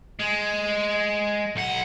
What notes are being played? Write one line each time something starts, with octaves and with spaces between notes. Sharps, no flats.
G#3
B1 F#5